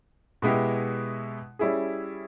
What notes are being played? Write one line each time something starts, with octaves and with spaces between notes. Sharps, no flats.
B2 G#3 B3 E4 G4
G3 C#4 E4 G#4